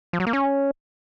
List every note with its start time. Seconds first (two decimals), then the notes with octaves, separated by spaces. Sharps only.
0.13 F3
0.20 F#3
0.27 A#3
0.33 C#4